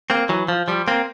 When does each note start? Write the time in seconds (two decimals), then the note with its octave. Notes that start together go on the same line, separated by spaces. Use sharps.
0.10 A#3 C4
0.29 E3 F#3
0.48 F3
0.68 F3 G3
0.88 A#3 C4